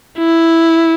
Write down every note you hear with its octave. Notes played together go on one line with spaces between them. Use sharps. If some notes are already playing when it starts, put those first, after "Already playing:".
E4